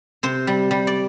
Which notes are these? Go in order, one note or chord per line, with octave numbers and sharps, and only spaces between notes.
C3 C5
G3
G3
D5